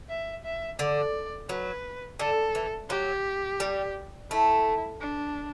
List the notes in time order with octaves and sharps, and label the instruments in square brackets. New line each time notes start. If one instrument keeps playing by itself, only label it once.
[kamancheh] E5
E5
[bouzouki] D3 [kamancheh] D5
[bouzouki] F#3 [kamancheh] B4
[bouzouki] D3 [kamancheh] A4
[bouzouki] E3
[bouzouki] F#3 [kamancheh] G4
[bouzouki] G3
[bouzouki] A3 [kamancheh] E4
[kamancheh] D4